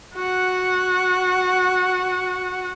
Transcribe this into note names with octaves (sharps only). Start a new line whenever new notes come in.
F#4 F#5